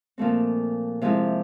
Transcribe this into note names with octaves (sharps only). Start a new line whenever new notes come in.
A#2 F3 A3 C4
C3 F3 G#3 C4 E4